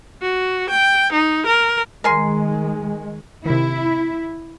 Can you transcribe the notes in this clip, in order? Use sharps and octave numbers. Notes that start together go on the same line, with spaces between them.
F#4
G5
D#4
A#4
D#3 G#3 A#4 G#5 C6
C3 D#3 E4